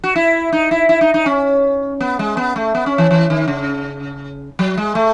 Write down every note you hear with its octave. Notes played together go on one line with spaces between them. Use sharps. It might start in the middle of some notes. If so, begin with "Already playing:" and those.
F#4
E4
D#4
E4
E4
D#4
D#4
C#4
B3
G#3
B3
A3
B3
C#4
E3
E3
D#3
C#3
F#3
G#3
A3